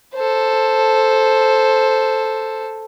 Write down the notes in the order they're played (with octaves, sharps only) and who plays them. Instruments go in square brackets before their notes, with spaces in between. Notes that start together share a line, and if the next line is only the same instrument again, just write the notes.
[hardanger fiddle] A4 C5